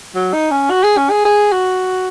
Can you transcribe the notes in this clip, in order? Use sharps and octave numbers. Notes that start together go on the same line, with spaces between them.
F#3
D#4
C#4
F#4
G#4
C#4
G#4
G#4
F#4